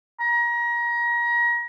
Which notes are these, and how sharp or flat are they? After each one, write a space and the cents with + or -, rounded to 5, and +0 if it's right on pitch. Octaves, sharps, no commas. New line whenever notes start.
A#5 +30